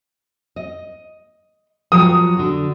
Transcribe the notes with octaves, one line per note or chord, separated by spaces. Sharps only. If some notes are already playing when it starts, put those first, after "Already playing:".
D#5
F3 F#3 D#6
D3 F#4